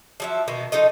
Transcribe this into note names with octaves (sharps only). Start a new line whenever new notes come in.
F3 F#3 E5
B2 D#3 A#3
F3 D#4 A4 D#5